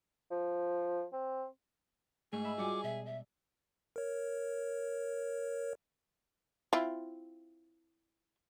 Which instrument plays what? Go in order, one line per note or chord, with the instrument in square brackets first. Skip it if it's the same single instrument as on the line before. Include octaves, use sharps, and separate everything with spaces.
[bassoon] F3
C4
[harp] G#2 [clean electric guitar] A3 [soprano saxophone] G#4
[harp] E5 [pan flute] B5
[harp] G3 [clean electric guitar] F4 F#4 G#5 [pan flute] D6
[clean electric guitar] B2 [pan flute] E5
[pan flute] E5
[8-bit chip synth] A#4 C#5
[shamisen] C4 E4 F4